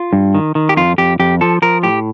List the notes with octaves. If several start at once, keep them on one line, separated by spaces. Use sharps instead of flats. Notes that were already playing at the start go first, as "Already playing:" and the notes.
Already playing: F4
G2
D#3
D#3
G4
F2 F4
F2 G4
F2 G4
F3 A4
F3 A#4
A2 G4